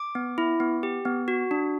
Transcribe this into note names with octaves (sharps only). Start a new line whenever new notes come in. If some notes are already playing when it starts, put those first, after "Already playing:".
Already playing: D6
B3
E4
B3
G4
B3
F#4
D4